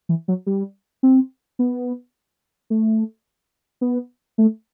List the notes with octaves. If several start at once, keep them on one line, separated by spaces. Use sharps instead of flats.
E3
F#3
G3
C4
B3
A3
B3
A3